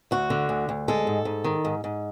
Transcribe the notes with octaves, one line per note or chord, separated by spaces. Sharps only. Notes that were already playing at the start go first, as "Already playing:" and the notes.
D2 F#4
D3
D2
D2
G#3 A4
G#2
G#2
D#3
G#2
G#2